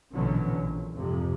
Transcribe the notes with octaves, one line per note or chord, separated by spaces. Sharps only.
A#1 B2 D3 E3 F#3 C#4
A#1
F2 G#2 C3